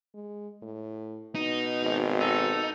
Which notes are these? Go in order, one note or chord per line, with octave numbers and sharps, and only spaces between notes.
G#3
A2
B2 D#4
G#1
D#4 A4